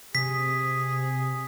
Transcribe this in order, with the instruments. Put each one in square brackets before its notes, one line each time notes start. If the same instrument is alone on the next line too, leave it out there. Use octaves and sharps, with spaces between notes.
[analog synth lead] C3 [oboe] G#4 [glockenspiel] B6